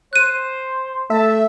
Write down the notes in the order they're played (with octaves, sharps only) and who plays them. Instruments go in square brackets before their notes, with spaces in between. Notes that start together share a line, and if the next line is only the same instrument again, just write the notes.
[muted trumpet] C5 [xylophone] F#6 D#7
[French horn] A3 [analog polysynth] E5 [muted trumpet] A5